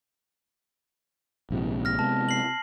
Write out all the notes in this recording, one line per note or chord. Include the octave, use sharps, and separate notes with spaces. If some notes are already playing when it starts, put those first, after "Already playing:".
A#1 G#2 C3
F6 A#6
C3 G#3 B3 A5
C7 F#7